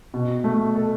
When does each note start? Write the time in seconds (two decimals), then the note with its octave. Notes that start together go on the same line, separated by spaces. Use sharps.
0.14 B2
0.44 A3
0.75 A4